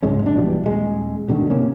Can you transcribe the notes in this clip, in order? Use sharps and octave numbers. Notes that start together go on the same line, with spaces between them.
C#2 G#2 G#3 C#4
F#1 C4 D4
A#1 B2 E3 G3
D#1 G#3
D2 B2 D3 D#3
C3 D#3 A#3 C#4